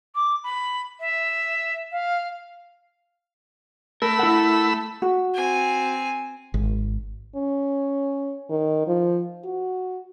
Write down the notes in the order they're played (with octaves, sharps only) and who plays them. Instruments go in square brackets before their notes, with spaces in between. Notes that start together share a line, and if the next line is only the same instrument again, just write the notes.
[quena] D6
B5
E5
F5
[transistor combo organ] A3 B5 E6 [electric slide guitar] A#4
[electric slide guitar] E4 A#4 F#5
[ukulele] F#4
[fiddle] C4 G#5
[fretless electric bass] G#1
[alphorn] C#4
D#3
F3
F#4